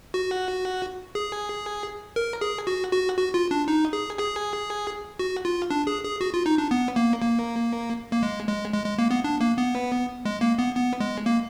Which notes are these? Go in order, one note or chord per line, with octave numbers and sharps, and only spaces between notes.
F#4
G#4
A#4
G#4
F#4
F#4
F#4
F4
D4
D#4
G#4
G#4
F#4
F4
D4
G#4
G#4
F#4
F4
D#4
D4
B3
A#3
A#3
A#3
G#3
G#3
G#3
G#3
A#3
B3
D4
A#3
B3
G#3
A#3
B3
B3
G#3
A#3